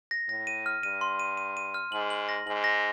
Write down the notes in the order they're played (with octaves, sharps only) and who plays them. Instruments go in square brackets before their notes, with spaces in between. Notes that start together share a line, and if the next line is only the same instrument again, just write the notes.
[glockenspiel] A#6
[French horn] A2 [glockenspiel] A#6
[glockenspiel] D#7
F6
[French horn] G2 [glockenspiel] D#7
[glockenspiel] C6
D#7
D#7
D#7
F6
[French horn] G#2 [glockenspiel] F#7
[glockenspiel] F#7
A#6
[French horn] G#2 [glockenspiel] F#7
[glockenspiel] A#6